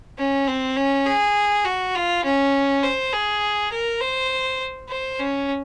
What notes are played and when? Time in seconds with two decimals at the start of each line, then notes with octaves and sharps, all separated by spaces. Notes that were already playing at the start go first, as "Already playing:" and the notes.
0.18 C#4
0.47 C4
0.76 C#4
1.06 G#4
1.65 F#4
1.95 F4
2.24 C#4
2.83 C5
3.12 G#4
3.72 A#4
4.01 C5
4.89 C5
5.19 C#4